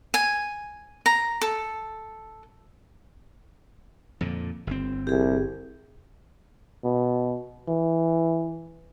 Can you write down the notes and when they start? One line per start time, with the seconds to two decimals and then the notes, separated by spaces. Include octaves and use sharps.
0.14 G#5
1.06 A#5
1.42 A4
4.21 F2 A#2 D3
4.67 G1 C4
5.07 C2 G4 G#4
6.84 B2
7.68 E3